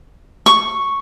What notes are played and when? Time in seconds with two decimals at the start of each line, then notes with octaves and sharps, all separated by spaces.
0.46 C#6